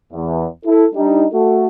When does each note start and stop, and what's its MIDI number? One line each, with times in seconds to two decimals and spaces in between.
0.13 0.46 40
0.65 0.85 64
0.65 0.85 69
0.95 1.25 55
0.95 1.25 62
0.95 1.25 63
1.32 1.68 57
1.32 1.68 66
1.32 1.68 69